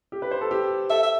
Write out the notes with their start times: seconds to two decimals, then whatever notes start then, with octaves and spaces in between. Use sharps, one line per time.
0.12 G4
0.22 B4
0.31 C5
0.41 A4
0.51 G4
0.90 A4 E5
1.03 E5